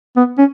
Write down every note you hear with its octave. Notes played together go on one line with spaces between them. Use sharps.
B3
C#4